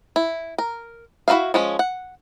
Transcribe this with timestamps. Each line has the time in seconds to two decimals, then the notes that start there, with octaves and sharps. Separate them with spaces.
0.16 E4
0.58 A#4
1.28 E4 F#4 B4 E5 F5
1.54 F3 G#3 C#4
1.79 F#5